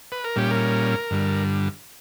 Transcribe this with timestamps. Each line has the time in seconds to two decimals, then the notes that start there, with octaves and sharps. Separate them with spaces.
0.12 B4
0.24 A#4
0.36 A#2 G3 C#4 G4
0.51 A#4
1.10 G2 D3 G3